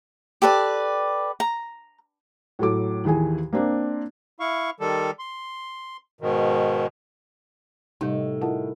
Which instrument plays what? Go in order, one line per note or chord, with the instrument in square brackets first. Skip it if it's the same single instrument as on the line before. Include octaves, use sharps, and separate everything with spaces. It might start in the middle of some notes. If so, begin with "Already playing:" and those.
[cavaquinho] G4 A4 B4 D5
A#5
[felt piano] A2 F#3 A4 D6
D#2 E3 G#4 G#5
A#3 C4 D4
[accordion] E4 F5 C#6
D#3 G3 A4
C6
G#2 B2 D#3
[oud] A2 [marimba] C3 G3 [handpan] D#4 G4
[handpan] E4 A#4 [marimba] F4 F#5 A5